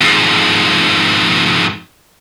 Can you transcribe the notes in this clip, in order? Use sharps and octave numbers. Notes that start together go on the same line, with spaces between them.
F2 G#2